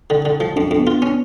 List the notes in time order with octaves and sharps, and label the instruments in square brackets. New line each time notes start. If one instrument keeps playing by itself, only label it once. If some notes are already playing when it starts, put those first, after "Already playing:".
[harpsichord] D3
D3
F3
[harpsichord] F2 [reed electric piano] D4
[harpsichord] F2
[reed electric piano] B3
[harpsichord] F4
C#4